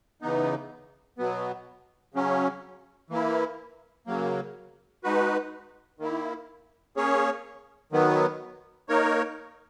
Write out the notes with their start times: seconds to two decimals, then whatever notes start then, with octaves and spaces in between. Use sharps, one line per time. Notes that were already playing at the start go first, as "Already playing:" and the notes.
0.21 C#3 E3 B3 D#4
1.18 B2 F#3 B3
2.14 C#3 F#3 C#4
3.10 E3 A#3 E4
4.07 C#3 F#3 A#3
5.04 G#3 D#4 F#4 B4
5.99 D#3 A#3 E4
6.97 A#3 C#4 G#4 C#5
7.92 D#3 F#3 B3
8.89 A#3 D#4 A#4 C#5